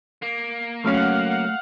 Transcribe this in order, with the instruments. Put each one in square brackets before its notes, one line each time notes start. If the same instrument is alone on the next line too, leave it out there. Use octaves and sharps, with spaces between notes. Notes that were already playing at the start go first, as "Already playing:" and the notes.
[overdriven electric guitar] A#3
[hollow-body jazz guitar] C#3 F#3 C#4 [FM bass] A3 [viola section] F5 F#5